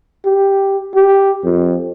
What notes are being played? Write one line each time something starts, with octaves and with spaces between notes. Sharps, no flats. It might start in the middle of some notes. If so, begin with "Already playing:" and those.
G4
G4
F2